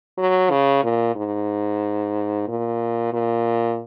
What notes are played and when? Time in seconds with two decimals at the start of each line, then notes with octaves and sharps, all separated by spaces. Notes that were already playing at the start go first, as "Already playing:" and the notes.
0.18 F#3
0.51 C#3
0.84 A#2
1.16 G#2
2.48 A#2
3.13 A#2